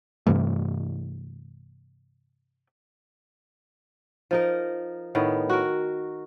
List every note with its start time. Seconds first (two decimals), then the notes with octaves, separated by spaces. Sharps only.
0.27 G2 C3 E3 A3
4.31 F3 D#4 A#4
5.15 A2 D#3 B3
5.50 F#4 A#4